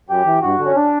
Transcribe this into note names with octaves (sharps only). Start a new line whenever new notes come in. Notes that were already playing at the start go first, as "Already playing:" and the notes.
F#2 G4
E3
G2 F#4
D3
C#4
D4